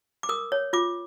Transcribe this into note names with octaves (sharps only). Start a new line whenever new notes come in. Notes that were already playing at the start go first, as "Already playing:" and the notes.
D6
A#4 D#6
C#5
F4 D6